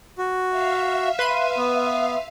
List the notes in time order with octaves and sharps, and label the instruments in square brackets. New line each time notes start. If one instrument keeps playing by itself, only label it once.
[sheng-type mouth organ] F#4
[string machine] E5 F5
[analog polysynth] B4 C6 D#7
[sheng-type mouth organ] B3